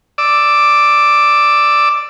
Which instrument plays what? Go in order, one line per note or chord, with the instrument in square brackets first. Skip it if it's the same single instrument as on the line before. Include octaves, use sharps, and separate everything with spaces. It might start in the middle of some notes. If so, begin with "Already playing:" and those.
[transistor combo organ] D5 D6 E6